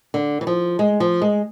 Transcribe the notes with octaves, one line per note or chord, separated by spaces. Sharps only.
D3
E3
F3
G#3
F3
G#3